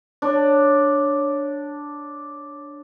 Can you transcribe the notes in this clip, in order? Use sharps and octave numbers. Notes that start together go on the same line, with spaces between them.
D4 C#5